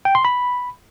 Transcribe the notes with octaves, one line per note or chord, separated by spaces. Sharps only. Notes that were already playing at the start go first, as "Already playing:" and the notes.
G5
C6
B5